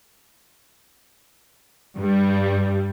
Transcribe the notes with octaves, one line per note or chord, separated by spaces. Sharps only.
G2 G3